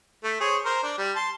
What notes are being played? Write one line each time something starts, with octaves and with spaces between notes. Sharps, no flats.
A3
G#4 C5 C#5
A#4 C5
D4
G3
A5 C6